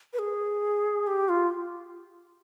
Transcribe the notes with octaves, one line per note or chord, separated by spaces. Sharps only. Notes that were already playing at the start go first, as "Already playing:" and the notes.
B4
G#4
G4
F4